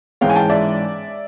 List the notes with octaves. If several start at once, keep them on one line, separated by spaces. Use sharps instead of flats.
G#2 E3 G#3 C#4 F5 G5
G#5
G5 A5
D5 E5